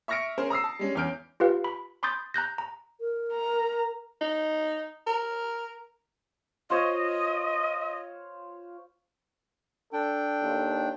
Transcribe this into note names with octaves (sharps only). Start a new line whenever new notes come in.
E5 C#6 F6 A#6 C#7 D7
C#4 G#4 A#4 C5
A#5 D#6 E6 C7
A5
G3 G#3 C#4
E2 C#4 F6 G6 D7
F4 G4 B4 F5
B5
B5 C6 D6 D#6 G6 A6
A#5 F#6 G6 A#6
A#5
A#4
A#5
D#4
A#4
F4 C5 C#5 D#5
D4 A4 G5
D#2